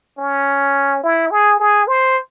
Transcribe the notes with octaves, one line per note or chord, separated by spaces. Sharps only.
C#4
E4
G#4
G#4
C5